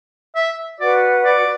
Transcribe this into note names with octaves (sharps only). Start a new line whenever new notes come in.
E5
F#4 B4 D5 F#5
D5